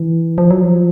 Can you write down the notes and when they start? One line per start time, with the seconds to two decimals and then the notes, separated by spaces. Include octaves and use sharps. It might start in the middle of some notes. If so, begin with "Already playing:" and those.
Already playing: E3
0.38 F3
0.50 F#3
0.62 F3